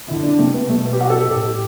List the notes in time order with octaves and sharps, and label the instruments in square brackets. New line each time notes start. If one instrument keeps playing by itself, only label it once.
[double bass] D3 [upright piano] E4
[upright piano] D4
[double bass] C3 [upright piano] A3
[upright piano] B3
[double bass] B2 [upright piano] A3
[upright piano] B3
G4
F#4
A4
G4
[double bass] A2 [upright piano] A4
[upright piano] G4